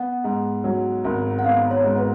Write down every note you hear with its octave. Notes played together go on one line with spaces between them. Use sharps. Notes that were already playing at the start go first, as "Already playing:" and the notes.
Already playing: B3 F#5
G#2
F#3
G#1
F#5
B3 F5
C#5
G#2
B4